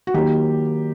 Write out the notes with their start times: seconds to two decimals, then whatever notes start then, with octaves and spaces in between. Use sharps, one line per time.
0.07 F#4
0.14 D#3 F#3 A#3 G4